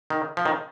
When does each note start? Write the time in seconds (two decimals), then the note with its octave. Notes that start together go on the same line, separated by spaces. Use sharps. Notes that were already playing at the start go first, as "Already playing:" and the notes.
0.10 D#3
0.37 F3
0.45 D#3